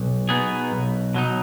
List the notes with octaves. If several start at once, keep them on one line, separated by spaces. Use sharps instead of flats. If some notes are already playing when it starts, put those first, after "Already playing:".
Already playing: B1
B2 B3 D#4 G#4
B1
B2 F#3 D#4